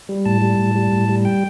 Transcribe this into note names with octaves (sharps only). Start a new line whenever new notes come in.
G3
A2 A5
G3
A2
G3
A2
G3
G5